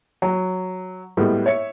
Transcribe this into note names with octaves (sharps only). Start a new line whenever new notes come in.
F#3
A2 G3 G#3 B3
C#5 E5 C#7